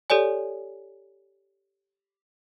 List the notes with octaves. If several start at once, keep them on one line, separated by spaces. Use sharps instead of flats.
G4 A4 C#5 D5 G#5